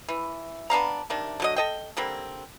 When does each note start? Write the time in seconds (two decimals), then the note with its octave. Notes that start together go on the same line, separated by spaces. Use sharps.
0.09 E3
0.70 B3 D4 F5 A#5
1.10 C3 D#3 D4
1.40 D3 F#3 D#5
1.56 A4 D#5 G5
1.97 D3 G3 A#3 C4